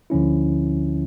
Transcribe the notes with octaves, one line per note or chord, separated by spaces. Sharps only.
D2 D3 F3 C#4 E4